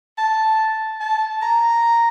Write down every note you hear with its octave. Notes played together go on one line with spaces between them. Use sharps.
A5
A5
A#5